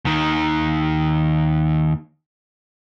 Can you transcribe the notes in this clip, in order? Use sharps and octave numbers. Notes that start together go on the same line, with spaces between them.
D#2 D#3